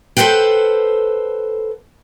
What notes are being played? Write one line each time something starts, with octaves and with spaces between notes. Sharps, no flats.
A4 B4 C5 F#5 G5